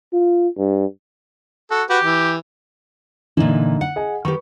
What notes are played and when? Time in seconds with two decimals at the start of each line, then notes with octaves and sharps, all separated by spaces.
0.13 F4
0.57 G2
1.71 F#4 A4
1.90 F#4 G4 B4
2.04 E3
3.37 A#2 D3 E3 D#4
3.81 F#5
3.96 G#4 D#5 G#5
4.25 D#3 G4 B4 C#6